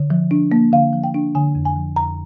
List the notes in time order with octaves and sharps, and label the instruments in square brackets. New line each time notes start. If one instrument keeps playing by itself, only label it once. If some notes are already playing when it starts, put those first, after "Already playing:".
Already playing: [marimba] D3
F3
D4
A#3
D3 F5
F3
G5
D4
D3 G#5
F2
G#5
F3
F2 A#5